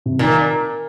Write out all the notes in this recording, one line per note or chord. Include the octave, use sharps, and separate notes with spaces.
C3
A#2 D#3